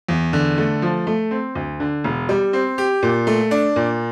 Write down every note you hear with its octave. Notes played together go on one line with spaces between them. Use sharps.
E2
D3
A3
F3
A3
C4
D2
D3
E1
G3
C4
G4
A#2
A3
D4
A#2